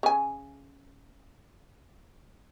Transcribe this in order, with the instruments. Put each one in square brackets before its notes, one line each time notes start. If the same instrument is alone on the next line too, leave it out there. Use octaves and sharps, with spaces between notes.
[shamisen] C#3 G#5